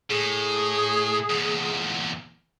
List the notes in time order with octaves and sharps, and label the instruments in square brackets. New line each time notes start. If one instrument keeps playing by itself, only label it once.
[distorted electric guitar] A2 [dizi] G#4
[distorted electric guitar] E2 A#2